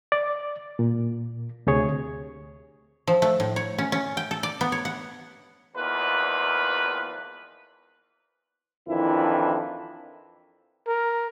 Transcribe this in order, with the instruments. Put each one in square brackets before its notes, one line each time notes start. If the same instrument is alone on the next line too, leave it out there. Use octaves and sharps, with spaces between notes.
[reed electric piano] D5
A#2
D2 C3 G#4 C#5
[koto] F3
A3
A2
C#5
C#4
C#4
G5
A4
D5
B3
C#5
F#5
[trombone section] G#1 E2 A#2 F3 B4
F2 D#3 E3 D4 E4
[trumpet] A#4